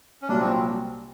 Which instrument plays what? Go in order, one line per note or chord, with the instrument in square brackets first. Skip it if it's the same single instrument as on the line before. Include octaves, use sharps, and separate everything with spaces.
[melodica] C#4
[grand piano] C2 A#2 F#3 [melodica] D4
[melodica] C4